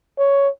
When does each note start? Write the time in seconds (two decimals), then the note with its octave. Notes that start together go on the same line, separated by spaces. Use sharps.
0.19 C#5